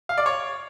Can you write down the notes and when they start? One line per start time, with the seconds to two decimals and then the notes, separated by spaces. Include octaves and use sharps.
0.09 F5
0.18 D5
0.26 C#5